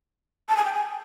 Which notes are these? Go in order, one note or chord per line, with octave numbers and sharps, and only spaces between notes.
A5
G#5
G5
G#5